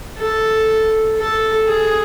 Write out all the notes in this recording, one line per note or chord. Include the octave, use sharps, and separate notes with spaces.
A4
A4
G#4